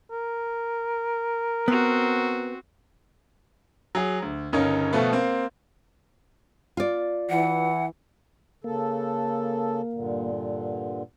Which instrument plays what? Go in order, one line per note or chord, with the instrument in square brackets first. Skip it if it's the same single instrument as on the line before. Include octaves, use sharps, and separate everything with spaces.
[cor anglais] A#4
[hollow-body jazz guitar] B3 [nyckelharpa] C4 F#4
[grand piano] F#3 G#4
D2
G1 C#3 C#4 D#4 A#4 C#5
B2 F3 A3 B3
A#3 C4
[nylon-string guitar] F4 D5
[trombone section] E3 [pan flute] F#5
[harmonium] C#3 A4 [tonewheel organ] A#3
[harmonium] G2 A#2 D3